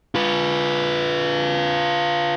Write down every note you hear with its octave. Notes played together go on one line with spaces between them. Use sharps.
F4 B4